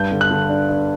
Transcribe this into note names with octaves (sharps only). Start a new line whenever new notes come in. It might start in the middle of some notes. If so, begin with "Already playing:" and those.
Already playing: G2 G6
D3
F#6
D3
D4
D4